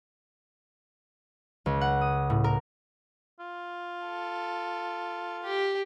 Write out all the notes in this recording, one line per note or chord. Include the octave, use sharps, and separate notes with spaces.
C#2
F#5
D#6
A2
A#4
F4
A4
G4